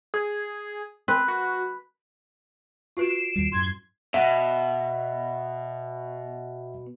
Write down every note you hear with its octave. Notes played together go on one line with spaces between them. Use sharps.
G#4
C4 B4
F#4
F4 F#4 B4 C7 D7 E7
D#2 G3
F#2 A2 C6 G#6
B2 E5 F#5